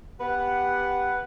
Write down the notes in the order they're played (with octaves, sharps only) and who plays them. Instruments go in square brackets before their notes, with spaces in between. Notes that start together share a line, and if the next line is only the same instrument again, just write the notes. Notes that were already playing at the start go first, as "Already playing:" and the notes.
[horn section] B3 G4 F#5 [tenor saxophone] B4